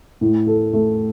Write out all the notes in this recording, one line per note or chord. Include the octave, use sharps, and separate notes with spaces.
A2
A4
A3